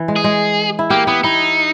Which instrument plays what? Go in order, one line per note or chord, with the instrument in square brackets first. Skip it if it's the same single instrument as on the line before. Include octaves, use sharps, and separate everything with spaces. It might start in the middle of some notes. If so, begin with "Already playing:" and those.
Already playing: [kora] E3
G#3
[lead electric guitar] G#4
[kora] G#3
E4
[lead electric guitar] A#3 [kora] G4
[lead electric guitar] B3 [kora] E4
[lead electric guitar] D#4 [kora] E4